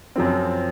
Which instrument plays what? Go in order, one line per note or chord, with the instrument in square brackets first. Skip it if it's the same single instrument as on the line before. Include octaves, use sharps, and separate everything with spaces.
[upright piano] F#2 F3 C4